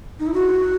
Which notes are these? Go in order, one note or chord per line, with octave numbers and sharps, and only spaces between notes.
D#4
E4
F#4